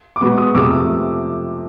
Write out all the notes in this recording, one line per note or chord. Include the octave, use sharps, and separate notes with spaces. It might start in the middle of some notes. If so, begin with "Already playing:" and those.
D6
B2 G#3 B3 B5 C#6
C#6 D#6
F2 C3 F3 A3 D6 E6